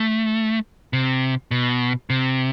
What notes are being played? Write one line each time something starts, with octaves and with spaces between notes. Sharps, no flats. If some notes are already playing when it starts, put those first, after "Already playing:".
Already playing: A3
C3
B2
C3